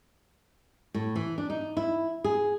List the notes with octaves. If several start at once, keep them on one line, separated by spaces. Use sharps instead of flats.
A2
E3
D4
D#4
E4
G#4